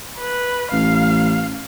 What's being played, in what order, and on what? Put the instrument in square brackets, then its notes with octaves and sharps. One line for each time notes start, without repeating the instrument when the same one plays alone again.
[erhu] B4
[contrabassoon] A1 [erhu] F5